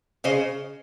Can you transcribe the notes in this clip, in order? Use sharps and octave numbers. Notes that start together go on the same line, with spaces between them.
C#3 C5 D#5